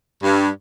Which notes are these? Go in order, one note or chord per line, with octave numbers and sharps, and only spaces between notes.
G2